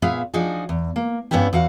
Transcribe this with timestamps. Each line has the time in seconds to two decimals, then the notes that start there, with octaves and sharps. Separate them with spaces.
0.02 A#2 B3 G#4 E5 F5
0.34 F3 D4 D#4 F#4 G#4
0.69 E2
0.96 A#3
1.31 G2 B3 C#4 D4 E4 G4
1.53 E2 F#4 F5 F#5